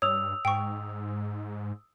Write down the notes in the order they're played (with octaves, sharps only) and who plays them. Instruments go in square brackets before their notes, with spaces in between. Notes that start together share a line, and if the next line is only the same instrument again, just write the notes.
[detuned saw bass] G2 [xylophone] C#5 [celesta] D#6 E6 F7
[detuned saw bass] G#2 [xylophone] G5 C#6